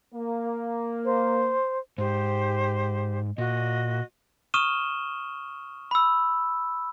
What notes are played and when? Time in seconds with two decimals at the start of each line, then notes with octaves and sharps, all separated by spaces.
0.15 A#3
1.05 C5
1.98 G#2 G4 C5
3.38 A#2 F#4 D#5
4.54 C#6 D#6 F6 D#7 E7 G7
5.91 B5 E6